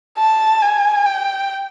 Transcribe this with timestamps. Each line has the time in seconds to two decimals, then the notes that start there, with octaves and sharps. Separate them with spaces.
0.19 A5
0.62 G#5
1.05 G5